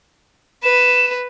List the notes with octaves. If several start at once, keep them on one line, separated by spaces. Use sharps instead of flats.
B4 E7